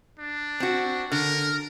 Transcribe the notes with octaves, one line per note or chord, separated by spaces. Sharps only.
D4
C4 F#4
D3 A#4